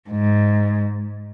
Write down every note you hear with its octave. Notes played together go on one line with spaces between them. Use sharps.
G#2